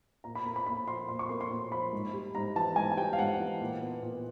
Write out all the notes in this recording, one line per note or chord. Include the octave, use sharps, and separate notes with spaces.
A#2 A#5
B5
A#3 A#5
B5
A#2 B5
F3 C6
A#2 C6
C#6
A#3 C6
C6
A#2
F3 B5
G#2
G3
G#2 A#5
E3 A5
G#2 G#5
G#5
G3 G5
F5
G#2 F#5
E3
A#2
B3
A#2